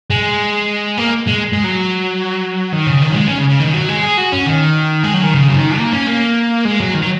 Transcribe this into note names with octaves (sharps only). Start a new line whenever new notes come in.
G#3
A#3
G#3
G#3
F#3
D#3
C#3
D#3
F#3
G#3
C#4
C#3
C#3
D#3
F#3
G#3
G#4
F#4
C#4
D#3
G#3
F#3
D#3
C#3
F#3
D#3
A#3
C#4
A#3
G#3
F#3
D#3
F#3